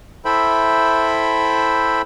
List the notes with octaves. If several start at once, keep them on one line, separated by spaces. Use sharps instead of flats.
E4 A4 C5 E5 G5 B5